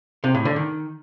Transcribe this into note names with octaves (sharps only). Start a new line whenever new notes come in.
C3
A2
D3
D#3